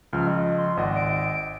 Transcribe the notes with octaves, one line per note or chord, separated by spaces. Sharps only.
C#2 F3 F6
D#5
C6
G#1 D5 D#5 F#5
D7